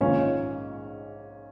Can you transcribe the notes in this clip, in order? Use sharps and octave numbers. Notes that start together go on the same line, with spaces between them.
A#1 G#2 D#3 C#4 F4